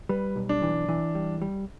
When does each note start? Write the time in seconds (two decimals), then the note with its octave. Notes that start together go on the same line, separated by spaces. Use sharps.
0.09 G3 B4
0.36 B1
0.49 D4
0.62 E3
0.89 E3
1.15 G3
1.42 G3